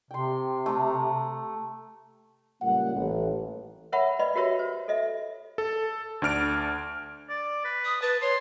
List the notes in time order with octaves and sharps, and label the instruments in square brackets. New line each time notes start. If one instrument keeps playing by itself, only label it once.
[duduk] C3 [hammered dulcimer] G5 C6
[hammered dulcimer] A3 A#5
[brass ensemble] C#2 A#2 G3 A#3 F#5
A1
[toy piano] A#4 C#5 E5 F#5 B5
B4 D5 D#5 B5
F#4 G4 A#4 C#5 E5
C5
A4 D#5 E5
[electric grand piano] A4
D2 D4 F6 D7
[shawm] D5
B4
[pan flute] D#6
[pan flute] B4 [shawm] A5
[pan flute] C#5 [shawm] C6